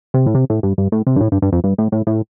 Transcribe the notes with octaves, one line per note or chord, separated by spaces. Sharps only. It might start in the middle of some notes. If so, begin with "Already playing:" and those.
C3
A2
C3
A2
G2
G2
A2
C3
G2
A2
G2
G2
F2
G2
A2
A2
A2